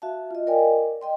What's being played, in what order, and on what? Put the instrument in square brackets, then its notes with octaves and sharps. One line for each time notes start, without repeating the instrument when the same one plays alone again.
[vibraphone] F#4 E5 F5 A5
F4 D#5
A#4 D5 D#5 F5 G5 G#5
D#5 G5 C6